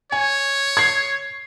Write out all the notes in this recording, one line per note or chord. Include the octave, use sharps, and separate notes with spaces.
C#5 G#5
G#6 C7